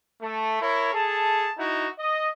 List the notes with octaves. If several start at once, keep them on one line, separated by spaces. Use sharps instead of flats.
A3
E4 A#4 C#5
G#4 A4 A5
D#4 E4 F#4
D#5